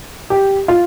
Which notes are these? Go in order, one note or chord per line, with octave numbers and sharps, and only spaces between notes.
G4
F4